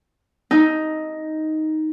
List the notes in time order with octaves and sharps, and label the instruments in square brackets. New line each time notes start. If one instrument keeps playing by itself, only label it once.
[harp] D#4